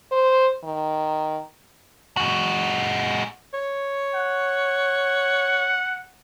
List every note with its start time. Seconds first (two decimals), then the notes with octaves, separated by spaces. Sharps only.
0.12 C5
0.64 D#3
2.17 G#3 F#4
3.54 C#5
4.15 F#5